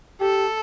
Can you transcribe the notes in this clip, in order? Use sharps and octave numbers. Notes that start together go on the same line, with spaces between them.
G4 A4